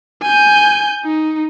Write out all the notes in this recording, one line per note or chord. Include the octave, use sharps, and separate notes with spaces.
G#5 G6
D#4